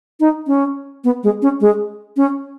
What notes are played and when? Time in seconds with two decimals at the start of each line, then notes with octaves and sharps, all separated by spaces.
0.20 D#4
0.47 C#4
1.04 B3
1.23 G#3
1.42 C#4
1.61 G#3
2.17 C#4